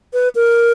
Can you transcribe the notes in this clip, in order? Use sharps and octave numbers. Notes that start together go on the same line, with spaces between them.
B4
A#4